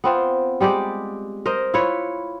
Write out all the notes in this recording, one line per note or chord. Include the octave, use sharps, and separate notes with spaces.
B3 C4 F4
G3 G#3 G4 D5
A#4 C5 D#5
E4 F4 B4 C#5